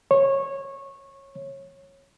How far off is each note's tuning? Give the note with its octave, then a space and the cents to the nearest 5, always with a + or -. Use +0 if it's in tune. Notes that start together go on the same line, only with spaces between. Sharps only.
C#5 -15